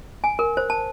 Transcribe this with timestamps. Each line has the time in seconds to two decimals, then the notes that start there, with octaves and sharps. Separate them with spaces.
0.24 G#5
0.39 A#4
0.57 C5
0.70 A5